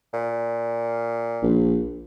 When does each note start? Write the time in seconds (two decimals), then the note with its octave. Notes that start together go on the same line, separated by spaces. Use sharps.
0.13 A#2
1.42 A#1